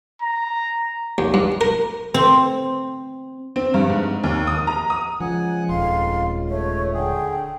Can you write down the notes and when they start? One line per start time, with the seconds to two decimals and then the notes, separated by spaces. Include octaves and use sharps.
0.22 A#5
1.18 D#2
1.34 G2
1.61 A#4
2.14 C4
3.56 C4
3.74 G2
3.90 G#2
4.23 D#2
4.47 D#6
4.67 A#5
4.90 D#6
5.20 C#2 F3 F#5 G#5 F#6
5.69 D#1 F2 F5 C6
6.50 A3 C#5
6.94 D3 G#4 G5